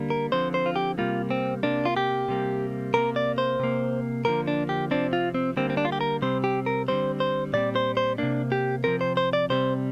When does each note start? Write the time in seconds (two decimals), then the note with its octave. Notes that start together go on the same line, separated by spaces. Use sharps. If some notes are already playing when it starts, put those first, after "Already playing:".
Already playing: D3 G3 A#3
0.10 A#4
0.32 D3 F3 C4 C5
0.54 C5
0.66 F4
0.76 G4
0.98 C3 G3 A#3 F4
1.31 C4
1.63 C3 A#3 D4
1.85 F4
1.97 G4
2.29 C3 G3 A#3
2.94 C3 A#3 A#4
3.16 D5
3.38 C5
3.60 C3 A#3
4.25 D3 F3 A#3 A#4
4.47 D4
4.69 G4
4.91 C3 F3 C4 D4
5.13 F4
5.35 C4
5.57 D3 G3 A#3 C4
5.70 C4
5.77 D4
5.85 F4
5.92 G4
6.01 A#4
6.22 C3 G3 C4 C5
6.44 G4
6.66 A#4
6.88 D3 G3 C4 C5
7.20 C5
7.53 A#2 G3 C4 D5
7.76 C5
7.97 C5
8.18 C3 A#3 D4
8.52 G4
8.84 C3 F3 C4 A#4
9.01 C5
9.17 C5
9.33 D5
9.50 C3 G3 C4 C5